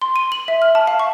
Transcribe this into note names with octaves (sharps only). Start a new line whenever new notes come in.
C6
D#7
F#7
E5
F6
A5
F5
C#6